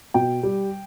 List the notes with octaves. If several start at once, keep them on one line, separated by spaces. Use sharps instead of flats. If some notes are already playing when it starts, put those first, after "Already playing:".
B2 G5
G3